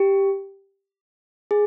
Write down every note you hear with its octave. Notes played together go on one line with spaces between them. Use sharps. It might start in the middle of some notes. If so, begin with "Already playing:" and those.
Already playing: G4
G#4